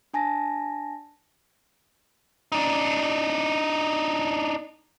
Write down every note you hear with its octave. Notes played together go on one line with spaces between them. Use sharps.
D4 G#5 A5 A#6
D4 D#4